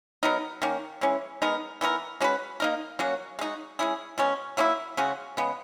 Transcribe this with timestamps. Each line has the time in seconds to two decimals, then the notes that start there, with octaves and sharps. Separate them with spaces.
0.23 F#3 B3 D#4 A#4
0.62 D#3 A#3 C#4
1.01 E3 G#3 C#4
1.42 G#3 B3 D#4 A#4
1.81 E3 B3 F#4 A#4
2.21 G#3 C#4 F#4 B4
2.60 A#3 D#4 A#4
2.99 F#3 A#3 C#4 F#4
3.39 G#3 D#4 F#4
3.79 G#3 C#4 E4 G#4
4.18 B2 G#3 C#4
4.57 F#3 A#3 C#4 E4
4.97 C#3 G#3 C#4 F#4
5.37 C#3 G#3 B3